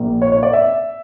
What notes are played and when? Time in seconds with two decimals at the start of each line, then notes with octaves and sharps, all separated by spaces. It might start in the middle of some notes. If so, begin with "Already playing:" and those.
Already playing: A#1 A#2 A#3
0.22 C#5
0.32 C#5
0.43 D5
0.53 E5